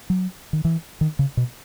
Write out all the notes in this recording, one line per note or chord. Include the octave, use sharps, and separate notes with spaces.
F#3
D#3
E3
D#3
C#3
B2